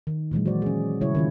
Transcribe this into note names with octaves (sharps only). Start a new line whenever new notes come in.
D#3
A#2 E3 F#3 G#3
F#4 C5 D5
C#4 G#4
C#3 G3 E4 C#5
D#3 C#4 F4